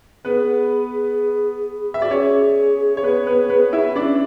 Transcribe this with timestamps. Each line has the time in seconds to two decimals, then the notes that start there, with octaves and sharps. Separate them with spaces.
0.25 B3 G#4 B4
1.94 E5
2.02 F#4 D5
2.10 C#4 G#4 C#5
2.97 C#5
3.03 B3 B4
3.26 B3 B4
3.50 B3 B4
3.73 E4 E5
3.96 C#4 D4 D5